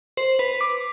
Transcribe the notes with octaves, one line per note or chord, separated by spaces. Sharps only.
C5
B4
D6